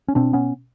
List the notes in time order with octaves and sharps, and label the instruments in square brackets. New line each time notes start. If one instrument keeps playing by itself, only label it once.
[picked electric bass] C#4
B2 C4 D4
B3 C#4